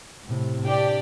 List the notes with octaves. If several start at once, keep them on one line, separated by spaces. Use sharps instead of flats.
A2 C3
D4 G4 D5 G5